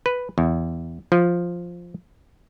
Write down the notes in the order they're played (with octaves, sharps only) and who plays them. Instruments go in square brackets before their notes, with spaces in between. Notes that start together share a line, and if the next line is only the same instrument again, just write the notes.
[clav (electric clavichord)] B4
E2
F3